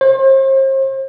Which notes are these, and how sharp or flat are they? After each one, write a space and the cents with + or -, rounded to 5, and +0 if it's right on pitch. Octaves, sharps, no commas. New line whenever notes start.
C5 +40